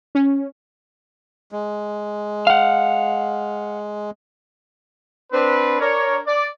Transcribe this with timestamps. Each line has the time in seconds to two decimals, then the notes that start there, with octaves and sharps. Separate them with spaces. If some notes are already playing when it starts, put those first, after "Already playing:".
0.15 C#4
1.52 G#3
2.47 F5 F#5
5.32 C4 D4 B4
5.79 D4 A#4 C#5
6.26 D5